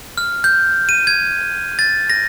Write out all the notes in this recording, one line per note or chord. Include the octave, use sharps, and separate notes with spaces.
F6
G6
D#7
G#6
A6
A#6